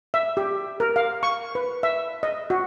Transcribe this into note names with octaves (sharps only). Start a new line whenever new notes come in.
E5
G4
A#4
F5
C#6
B4
E5
D#5
F#4